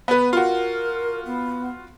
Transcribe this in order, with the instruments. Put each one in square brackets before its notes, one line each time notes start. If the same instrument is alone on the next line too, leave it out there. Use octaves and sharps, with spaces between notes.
[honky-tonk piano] B3 B4
[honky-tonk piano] F4 F#4 [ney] A#4
[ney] B3